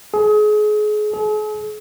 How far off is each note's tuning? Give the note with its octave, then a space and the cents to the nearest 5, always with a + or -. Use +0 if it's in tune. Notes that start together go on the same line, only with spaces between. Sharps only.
G#4 +30
G#4 +45